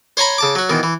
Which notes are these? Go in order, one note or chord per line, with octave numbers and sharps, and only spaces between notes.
C5 C#5 G#5 A#5 B5
C#3 A5 D6
F#3 F#4
B2 D#3 E3
E3